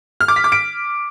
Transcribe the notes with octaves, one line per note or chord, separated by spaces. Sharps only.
F6
D6
B6
D6
D7